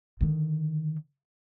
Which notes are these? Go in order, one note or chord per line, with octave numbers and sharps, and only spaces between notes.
D3 D#3